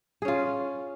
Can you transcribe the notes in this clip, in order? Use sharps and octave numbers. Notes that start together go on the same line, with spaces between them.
C#4 F4 G#4